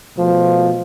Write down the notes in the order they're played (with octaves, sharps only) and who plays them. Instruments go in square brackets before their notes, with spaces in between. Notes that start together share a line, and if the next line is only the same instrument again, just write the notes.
[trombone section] B2 F3 A3